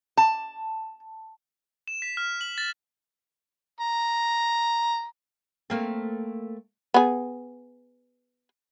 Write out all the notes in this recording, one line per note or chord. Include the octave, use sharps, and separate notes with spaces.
A5
E7
B6
F6
F#7
A6
A#5
A3 A#3 C4
B3 G#4